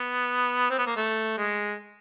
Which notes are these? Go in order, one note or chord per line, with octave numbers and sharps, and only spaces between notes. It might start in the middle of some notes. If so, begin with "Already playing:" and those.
Already playing: B3
C4
B3
A#3
A3
G#3